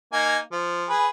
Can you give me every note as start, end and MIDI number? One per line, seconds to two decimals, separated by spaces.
0.13 0.38 58
0.13 0.38 63
0.13 0.38 80
0.52 0.87 53
0.90 1.08 68
0.90 1.08 71